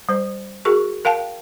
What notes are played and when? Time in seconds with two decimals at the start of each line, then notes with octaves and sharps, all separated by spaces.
0.09 G3 C5
0.65 F#4 G#4 A#4 C#6
1.05 A#4 F5 G5 A5